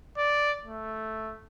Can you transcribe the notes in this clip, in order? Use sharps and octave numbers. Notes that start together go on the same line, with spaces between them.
D5
A3